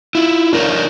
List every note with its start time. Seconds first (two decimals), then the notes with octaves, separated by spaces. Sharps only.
0.15 E4 F4
0.53 D4 D#4 A#4 C#5